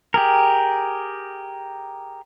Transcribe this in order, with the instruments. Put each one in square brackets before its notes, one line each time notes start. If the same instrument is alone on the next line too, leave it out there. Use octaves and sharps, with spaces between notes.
[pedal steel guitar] G4 G#4 A#4